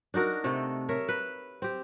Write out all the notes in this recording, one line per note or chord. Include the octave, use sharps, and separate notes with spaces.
D4 D#4 F#4 A#4
C3 A3 A4
A#4 C#5 E5
B4
C4 G4